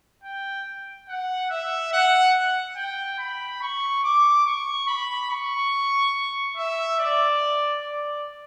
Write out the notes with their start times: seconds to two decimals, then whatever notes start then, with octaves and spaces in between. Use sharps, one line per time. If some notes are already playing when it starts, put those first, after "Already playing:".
0.24 G5
1.08 F#5
1.50 E5
1.93 F#5
2.76 G5
3.19 B5
3.62 C#6
4.04 D6
4.46 C#6
4.88 B5
5.30 C#6
6.57 E5
6.99 D5
7.84 D5